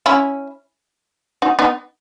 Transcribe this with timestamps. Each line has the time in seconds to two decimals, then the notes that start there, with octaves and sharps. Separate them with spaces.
0.06 C#4 E4
1.42 D#4 F#4
1.59 B3 D#4